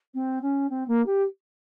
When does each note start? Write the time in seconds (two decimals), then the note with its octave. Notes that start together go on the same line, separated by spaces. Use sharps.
0.14 C4
0.41 C#4
0.69 C4
0.87 A#3
1.05 G4